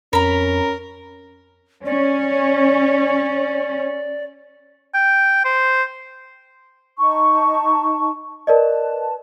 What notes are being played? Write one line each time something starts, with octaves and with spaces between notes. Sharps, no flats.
F2 C#4 A#4 A#5 B5
C#4 D5
G5
C5
D#4 A5 C#6
A#4 B4 D5 D#5 A5